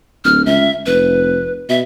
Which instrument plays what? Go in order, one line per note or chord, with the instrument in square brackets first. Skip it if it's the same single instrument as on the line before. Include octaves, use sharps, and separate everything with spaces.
[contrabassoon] D1 [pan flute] F6
[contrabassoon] C#2 [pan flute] E5
[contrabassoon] F1 [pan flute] B4
[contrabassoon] B2 [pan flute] E5